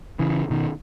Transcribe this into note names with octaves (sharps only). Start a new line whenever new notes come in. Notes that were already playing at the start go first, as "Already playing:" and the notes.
C#3 E3
B2 D#3